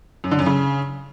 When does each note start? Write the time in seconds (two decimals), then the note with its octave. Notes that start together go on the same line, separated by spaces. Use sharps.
0.24 F#2
0.31 D3
0.39 F#2
0.46 C#3